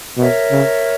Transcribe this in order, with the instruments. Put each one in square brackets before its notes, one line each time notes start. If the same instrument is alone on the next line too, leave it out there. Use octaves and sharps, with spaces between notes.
[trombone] B2 [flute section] A#4 C#5 E5
[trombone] C#3